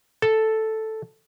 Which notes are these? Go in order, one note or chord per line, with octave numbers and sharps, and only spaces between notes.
A4